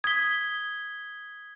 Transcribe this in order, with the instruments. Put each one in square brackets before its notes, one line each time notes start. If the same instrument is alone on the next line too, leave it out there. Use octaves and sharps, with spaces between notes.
[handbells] D#6 B6 [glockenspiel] G#6 G7